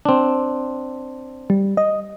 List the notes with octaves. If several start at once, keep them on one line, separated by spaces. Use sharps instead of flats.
C4 D4
G3
D#5